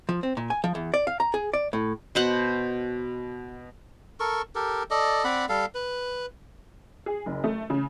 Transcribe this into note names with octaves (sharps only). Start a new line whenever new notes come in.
F3
C4
A#2
G#5
F3
E2
D5
F5
A#5
G#4
D5
A2
B2 C5 F#5
A4 A#4 C#6
G4 A4 A#4
A4 D5 D#5
C4 D5 F#5 B5
G3 A4 F5
B4
G#4
F#1
A3
C#3